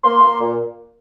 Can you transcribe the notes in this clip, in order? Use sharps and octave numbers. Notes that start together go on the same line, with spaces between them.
A#3 C6
A#3
A#2